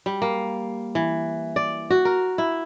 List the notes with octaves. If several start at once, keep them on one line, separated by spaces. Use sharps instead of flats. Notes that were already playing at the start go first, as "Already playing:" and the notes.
G3
A#3
E3
D5
F#4
A#4
E4